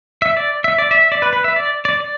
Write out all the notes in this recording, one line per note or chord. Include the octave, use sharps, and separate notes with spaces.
E5
D5
E5
D5
E5
D5
B4
B4
E5
D5
D5
D5